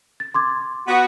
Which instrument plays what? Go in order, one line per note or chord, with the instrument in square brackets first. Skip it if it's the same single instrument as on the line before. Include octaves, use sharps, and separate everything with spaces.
[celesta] A6
C6 D6 G#6
[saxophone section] B3 F#4